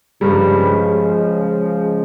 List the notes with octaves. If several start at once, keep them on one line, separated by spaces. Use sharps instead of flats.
G2 C#3 F3 G3 G#3